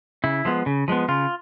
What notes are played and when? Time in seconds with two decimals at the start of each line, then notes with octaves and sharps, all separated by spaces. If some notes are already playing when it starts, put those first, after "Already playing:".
0.24 C#3 E4
0.45 F3 G#3 B3
0.66 C#3
0.88 F3 G#3 B3
1.08 C#3 F4